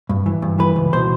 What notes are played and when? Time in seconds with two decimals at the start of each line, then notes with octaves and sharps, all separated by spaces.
0.09 G2
0.26 E3
0.42 G2
0.59 E3 B4
0.76 C#2
0.93 B2 C5